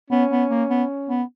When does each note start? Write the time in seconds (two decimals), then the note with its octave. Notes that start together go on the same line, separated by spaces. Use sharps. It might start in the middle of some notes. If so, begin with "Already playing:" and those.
0.10 B3 C#4
0.30 B3
0.50 A#3
0.70 B3
1.09 B3